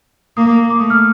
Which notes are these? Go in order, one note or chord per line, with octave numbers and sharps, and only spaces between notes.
A#3 D#6
D6
A3 D#6
F6